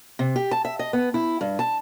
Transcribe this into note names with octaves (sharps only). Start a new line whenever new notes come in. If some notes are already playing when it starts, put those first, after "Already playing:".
C3
G4
A5
E5
D#5
B3
E4
G2
A5